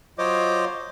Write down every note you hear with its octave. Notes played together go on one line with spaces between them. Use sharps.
F#3 F4 C5 C#5 D#5 D6